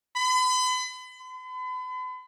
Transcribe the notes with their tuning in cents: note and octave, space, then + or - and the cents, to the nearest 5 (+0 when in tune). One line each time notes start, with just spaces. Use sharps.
B5 +40
B5 +45